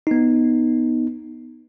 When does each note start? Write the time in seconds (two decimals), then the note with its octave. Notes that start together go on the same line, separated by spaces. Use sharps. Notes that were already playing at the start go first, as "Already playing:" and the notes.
0.07 B3 D#4